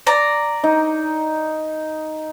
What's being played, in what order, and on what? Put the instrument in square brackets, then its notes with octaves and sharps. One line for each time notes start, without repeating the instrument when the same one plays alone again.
[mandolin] D5 A#5
[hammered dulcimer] D#4